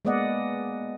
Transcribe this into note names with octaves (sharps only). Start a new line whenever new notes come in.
G#3 A#3 B3 D5 D#5 F#5